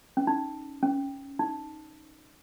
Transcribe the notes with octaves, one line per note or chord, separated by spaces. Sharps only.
C#4
D#4
C#4
D#4